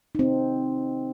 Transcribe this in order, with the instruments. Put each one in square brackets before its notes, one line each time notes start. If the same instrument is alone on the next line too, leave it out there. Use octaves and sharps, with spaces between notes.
[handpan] C4 D#4